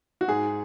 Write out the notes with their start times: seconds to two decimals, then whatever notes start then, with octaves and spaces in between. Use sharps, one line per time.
0.21 F#4
0.28 G#2 G#4